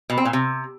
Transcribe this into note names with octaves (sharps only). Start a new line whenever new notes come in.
B2
C4
A#2
C3